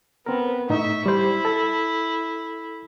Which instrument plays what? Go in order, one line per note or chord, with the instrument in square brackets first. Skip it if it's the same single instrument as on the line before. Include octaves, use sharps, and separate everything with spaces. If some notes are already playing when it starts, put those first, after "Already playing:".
[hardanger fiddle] B3 [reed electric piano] C4 A#4
[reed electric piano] A2 D#4 [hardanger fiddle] E5 C#6
[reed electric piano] G3 C5 [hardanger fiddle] E4
[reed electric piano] A4